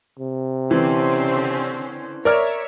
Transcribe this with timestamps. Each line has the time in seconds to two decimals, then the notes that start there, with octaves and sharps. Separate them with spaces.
0.19 C3
0.71 D3 E3 C4 C#4
2.25 A#4 C#5 D5 E5 F6